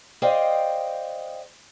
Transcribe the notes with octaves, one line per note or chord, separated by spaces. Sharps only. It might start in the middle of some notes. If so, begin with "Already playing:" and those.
G#4 C5 D5 D#5 F5 G5